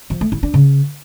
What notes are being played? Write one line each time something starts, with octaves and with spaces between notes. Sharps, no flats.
F3
A3
E4
D4
C#3